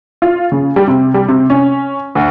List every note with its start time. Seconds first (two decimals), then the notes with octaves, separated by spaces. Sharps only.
0.22 F4
0.52 C#3
0.76 G3
0.88 C3
1.14 G3
1.28 C3
1.50 C#4
2.15 D2